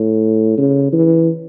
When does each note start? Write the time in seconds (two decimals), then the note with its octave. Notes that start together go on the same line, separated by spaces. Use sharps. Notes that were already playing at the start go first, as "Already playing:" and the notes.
Already playing: A2
0.57 C#3
0.93 E3